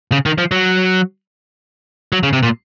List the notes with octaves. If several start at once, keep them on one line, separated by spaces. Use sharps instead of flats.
C#3
D#3
F3
F#3
F#3
C#3
C3
A#2